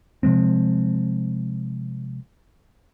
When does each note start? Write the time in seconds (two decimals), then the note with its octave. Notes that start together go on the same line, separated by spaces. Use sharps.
0.23 C3 F3 G#3 C4